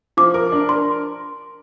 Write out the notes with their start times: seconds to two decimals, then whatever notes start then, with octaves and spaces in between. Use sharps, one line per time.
0.17 F3 D6
0.34 A#4
0.52 D4
0.69 A#4 C6